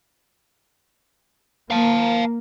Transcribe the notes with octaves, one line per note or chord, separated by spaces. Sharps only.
A#3 F5 A5